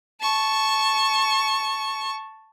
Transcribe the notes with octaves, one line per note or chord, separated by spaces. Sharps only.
A5 C#6